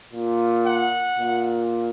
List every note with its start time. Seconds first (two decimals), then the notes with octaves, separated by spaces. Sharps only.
0.13 A#2
0.65 F#5
1.19 A#2